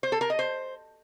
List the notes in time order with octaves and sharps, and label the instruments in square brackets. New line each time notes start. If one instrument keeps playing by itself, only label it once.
[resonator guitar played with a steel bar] C5
A4
A#4
D#5
C5